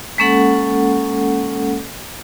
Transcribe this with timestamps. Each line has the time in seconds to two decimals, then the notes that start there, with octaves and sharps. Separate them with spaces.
0.18 G#3 A#3 C#4 A4 F#5